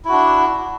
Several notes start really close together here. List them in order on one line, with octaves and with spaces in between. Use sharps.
E4 F#4 D4